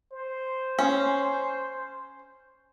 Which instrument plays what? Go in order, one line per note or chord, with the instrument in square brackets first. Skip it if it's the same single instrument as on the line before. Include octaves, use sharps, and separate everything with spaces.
[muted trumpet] C5
[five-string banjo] C#4